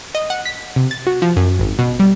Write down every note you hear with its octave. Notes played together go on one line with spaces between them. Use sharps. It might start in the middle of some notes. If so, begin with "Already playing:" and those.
D#5
F#5
B6
C3
A6
F#4
F3
F#2
G#1
B2
G3